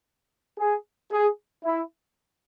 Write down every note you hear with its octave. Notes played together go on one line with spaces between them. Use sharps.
G#4
G#4
E4